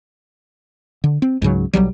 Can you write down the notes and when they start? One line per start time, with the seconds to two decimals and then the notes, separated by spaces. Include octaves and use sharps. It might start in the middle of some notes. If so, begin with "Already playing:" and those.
1.04 D3
1.22 C4
1.42 C#2 G#2 C#3 F#3
1.73 B1 F#2 F#3 G3